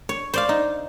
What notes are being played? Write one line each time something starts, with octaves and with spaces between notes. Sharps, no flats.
C#5
C5 D5 F5
D#4